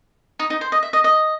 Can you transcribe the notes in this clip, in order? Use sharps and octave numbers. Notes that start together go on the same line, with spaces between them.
D#4
D#4
C5
D#5
E5
D#5
D#5